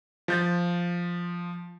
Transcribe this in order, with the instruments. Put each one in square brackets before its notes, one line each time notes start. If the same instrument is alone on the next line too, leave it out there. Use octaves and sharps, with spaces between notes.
[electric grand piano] F3 G6 A6